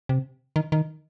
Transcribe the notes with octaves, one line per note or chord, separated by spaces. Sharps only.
C3
D#3
D#3